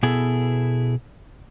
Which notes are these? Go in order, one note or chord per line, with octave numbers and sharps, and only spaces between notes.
B2 B3 E4 G#4 A4